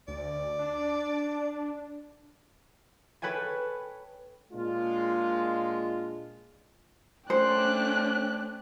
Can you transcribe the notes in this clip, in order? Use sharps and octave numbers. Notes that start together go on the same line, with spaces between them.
D2 D5
D4
A4 B4 C#5 G5 G#5
A#2 G#3 D4 F4
A3 C#4 D4 C5 D5 G5 F#6